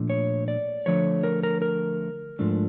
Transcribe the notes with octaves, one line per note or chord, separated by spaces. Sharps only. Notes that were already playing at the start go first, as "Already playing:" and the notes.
Already playing: A#2 F3 A3 D4
C#5
D5
D3 F3 A3 C#5
A#4
A#4
A#4
G#2 F3 A3 D4